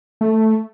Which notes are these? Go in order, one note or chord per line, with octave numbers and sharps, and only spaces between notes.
A3